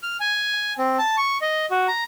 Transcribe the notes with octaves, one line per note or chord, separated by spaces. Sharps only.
F6
G#5
C4
A5
C#6
D#5
F#4
A#5